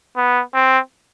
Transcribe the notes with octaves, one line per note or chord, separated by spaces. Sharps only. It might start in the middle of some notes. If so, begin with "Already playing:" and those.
B3
C4